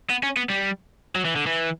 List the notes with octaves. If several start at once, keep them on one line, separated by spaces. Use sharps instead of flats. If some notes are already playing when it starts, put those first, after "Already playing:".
B3
C#4
B3
G3
F#3
E3
D3
E3